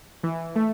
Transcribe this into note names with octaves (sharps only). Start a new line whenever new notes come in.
E3
A3